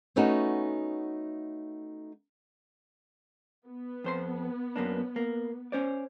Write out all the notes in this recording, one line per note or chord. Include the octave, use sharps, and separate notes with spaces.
A3 B3 C#4 D#4 F#4
B3
F2 C5 C6
F#2 A#3 D4
A#3
C#4 C5 D5